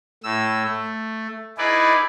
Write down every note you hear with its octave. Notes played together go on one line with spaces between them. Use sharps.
A2 E6
A3
D#4 E4 G#4 B4 D5